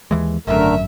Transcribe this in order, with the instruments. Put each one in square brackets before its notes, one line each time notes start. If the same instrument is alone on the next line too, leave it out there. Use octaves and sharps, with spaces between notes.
[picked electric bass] D#2 E3 G#3
[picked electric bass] G#1 F#2 [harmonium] D3 A3 A#4 [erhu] E5